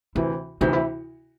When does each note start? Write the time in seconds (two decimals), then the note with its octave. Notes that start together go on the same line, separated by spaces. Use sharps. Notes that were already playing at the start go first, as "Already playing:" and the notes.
0.15 D2 C3 E3 E4
0.61 D2 C3 E3 D#4
0.73 E4